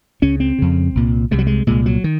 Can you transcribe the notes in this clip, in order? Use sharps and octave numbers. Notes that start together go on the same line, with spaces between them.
C#2 C#3 C#4
C4
F2 C#3
C2 A#2
C2 C3 G#3
F#3
G#3
C2 A#2 G#3
F#3
D#3